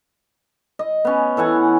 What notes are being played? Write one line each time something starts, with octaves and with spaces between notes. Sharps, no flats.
D#5
B3 C#4
E3 A4 F#5 G#5